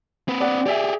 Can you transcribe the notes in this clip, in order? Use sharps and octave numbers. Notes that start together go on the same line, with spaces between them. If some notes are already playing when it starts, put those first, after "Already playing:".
C4 B4
D5 F#5
G4 G#4 D5 E5